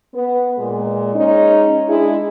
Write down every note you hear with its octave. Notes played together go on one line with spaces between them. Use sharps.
B3
A#2 G#3
G#3 C#4 D#4
G#3 D4 E4 G#4